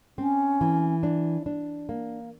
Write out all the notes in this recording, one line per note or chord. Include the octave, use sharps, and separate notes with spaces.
C4 C#4
E3
D4
D4
A#3